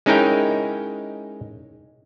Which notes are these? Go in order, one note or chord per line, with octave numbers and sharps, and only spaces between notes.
G#3 C#4 D#4 E4 A#4 G5